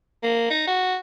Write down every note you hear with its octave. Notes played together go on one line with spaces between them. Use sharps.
A#3
D#4
F#4